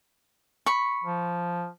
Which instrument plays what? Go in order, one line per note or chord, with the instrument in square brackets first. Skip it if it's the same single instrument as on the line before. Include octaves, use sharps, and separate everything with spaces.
[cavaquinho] B5 C#6
[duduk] F3